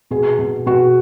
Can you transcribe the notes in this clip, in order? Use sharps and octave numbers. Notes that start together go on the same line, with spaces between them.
B2 G#4
B2
B2 F#4